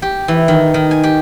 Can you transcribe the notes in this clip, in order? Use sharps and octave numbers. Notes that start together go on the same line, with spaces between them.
G4
E3
D#3
D#3
G#5
G4